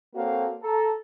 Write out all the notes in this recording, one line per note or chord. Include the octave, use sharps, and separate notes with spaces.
A#3 C4 F#4 A4 C#5 F5
A4 A5 A#5